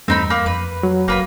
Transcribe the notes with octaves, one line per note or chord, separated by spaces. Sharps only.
E2 G2 A3 C4 D#4 B5
A#3 B5
F2 B4
F#3
F#1 A#3 B4 B5